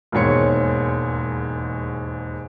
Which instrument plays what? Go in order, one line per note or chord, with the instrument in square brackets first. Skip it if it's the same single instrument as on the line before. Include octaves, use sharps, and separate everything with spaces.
[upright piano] E1 D#2 G#2 C#5 C#7